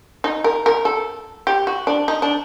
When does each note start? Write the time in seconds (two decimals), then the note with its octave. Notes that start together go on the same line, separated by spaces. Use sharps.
0.24 D#4
0.44 A#4
0.66 A#4
0.85 A4
1.47 G4
1.67 F#4
1.87 D4
2.08 D#4
2.22 D4